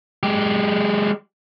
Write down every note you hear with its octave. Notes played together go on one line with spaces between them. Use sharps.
G#3 G4